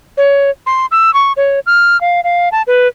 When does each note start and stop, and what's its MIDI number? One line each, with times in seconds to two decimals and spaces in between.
0.17 0.50 73
0.66 0.86 84
0.91 1.13 88
1.14 1.33 85
1.37 1.60 73
1.66 2.00 89
2.01 2.21 77
2.24 2.49 77
2.52 2.62 81
2.67 2.88 71